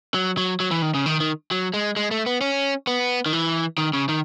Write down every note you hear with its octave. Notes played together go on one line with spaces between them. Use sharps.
F#3
F#3
F#3
E3
D#3
C#3
D#3
D#3
F#3
G#3
G#3
A3
B3
C#4
B3
D#3
E3
D#3
C#3
D#3